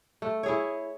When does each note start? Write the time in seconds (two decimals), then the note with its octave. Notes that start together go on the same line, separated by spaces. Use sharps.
0.22 A3
0.43 E4 G#4 C#5